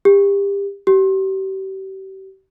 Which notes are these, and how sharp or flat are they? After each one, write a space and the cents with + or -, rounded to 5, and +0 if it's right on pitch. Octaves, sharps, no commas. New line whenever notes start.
G4 +30
G4 -35